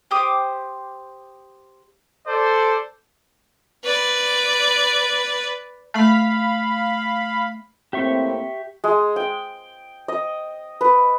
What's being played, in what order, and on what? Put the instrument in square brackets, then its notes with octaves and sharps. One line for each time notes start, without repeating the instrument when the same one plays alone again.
[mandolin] G4 C5 D6 D#6
[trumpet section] A4 C5 D5
[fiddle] B4 D5
[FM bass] A3 [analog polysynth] F5 B5
[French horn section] A2 A#3 C4 [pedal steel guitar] G4 E5 C#6
[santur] G#3
G5
D#5
B4